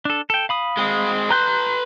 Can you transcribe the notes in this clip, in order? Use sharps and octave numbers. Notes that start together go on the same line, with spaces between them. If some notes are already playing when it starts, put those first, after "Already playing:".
D4 A4
A4 G5
F5 B5 D#6
G#3 C4
B4 A#5 C6 F#6 G6